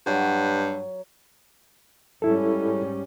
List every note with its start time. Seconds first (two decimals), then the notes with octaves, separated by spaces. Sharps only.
0.06 G2 F#3
2.22 G#2 G3 C#4 E4 A4